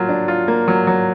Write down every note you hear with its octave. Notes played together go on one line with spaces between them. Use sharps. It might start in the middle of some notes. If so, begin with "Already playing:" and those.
Already playing: F#3 A#3 F4
D4
F4
A#3
F#3
F#3